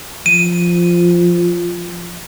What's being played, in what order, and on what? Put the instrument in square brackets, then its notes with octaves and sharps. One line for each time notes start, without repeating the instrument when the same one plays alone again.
[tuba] F3 [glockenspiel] D#7